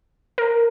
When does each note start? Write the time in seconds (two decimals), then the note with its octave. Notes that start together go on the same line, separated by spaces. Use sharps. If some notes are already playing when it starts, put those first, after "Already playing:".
0.38 A#4